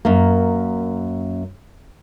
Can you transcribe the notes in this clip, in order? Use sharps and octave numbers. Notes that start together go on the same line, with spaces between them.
F#2 A#3